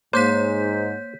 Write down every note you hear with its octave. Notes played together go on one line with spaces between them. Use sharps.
G#2 A#3 C5 C#5 G6 B6